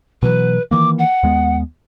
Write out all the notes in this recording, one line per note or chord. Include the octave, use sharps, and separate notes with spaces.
B2 E3 F#3 B4
D#3 E3 A#3 D6
F#5
D#2 G#3 B3